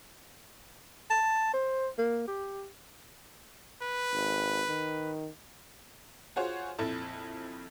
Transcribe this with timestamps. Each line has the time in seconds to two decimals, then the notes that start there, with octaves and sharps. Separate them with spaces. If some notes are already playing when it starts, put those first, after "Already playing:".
1.10 A5
1.54 C5
1.98 A#3
2.27 G4
3.83 B4
4.14 G#1
4.69 D#3
6.36 F4 F#4 G#4 C5 C#5
6.78 A#1 F2 E4 A4 A5